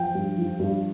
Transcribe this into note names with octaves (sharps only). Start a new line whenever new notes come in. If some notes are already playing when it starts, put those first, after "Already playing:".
Already playing: F3 G5
G2
F3
G2